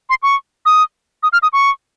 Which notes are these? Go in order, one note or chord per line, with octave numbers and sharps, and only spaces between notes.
C6
C#6
D#6
D#6
F6
D#6
C#6